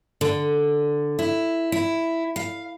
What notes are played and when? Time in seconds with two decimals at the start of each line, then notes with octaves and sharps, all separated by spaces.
0.21 D3
1.19 E4
1.72 E4
2.36 F5